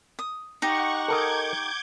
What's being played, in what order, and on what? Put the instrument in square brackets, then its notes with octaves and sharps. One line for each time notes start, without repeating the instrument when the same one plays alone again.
[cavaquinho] D#6
[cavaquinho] D#4 G4 [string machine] F#5 C#6
[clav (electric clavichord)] A4 A#4 D#5 [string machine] D6 G6 G#6